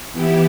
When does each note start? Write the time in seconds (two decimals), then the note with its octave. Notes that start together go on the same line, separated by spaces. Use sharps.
0.13 E3 B3 E4 G4